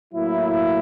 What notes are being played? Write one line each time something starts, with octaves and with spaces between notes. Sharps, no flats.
A2 F#3 A#3 E4